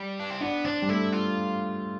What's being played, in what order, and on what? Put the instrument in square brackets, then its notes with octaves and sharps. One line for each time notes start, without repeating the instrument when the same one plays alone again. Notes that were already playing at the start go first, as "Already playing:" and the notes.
Already playing: [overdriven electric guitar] G3
D4
C4
[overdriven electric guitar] B3 [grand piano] D4
[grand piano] C4 [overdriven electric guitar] D4
[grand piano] G3
[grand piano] A3 [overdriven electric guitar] E4
[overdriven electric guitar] F4